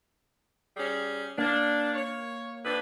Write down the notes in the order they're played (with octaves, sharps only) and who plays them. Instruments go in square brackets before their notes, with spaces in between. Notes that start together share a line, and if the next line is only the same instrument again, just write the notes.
[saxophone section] G3 C#4 G#4
[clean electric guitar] A#3 [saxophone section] D4
[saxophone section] C#5
F2 D4 B4